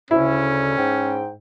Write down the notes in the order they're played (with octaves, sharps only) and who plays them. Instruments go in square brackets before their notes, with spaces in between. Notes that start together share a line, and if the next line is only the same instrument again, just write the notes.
[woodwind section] D2 C#3 [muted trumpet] C#4 [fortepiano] E4
[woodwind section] G#2 G5